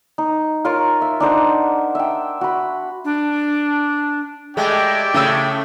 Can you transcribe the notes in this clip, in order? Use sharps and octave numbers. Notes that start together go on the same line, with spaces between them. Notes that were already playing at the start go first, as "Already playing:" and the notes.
D#4
F4 A#4 C#5 F5
E5
D4 D#4 C5 F#5
E5 G5
F#4 B5
D4
G#3 A3 E4 G4 D5 G5
A2 C#3 A3 E6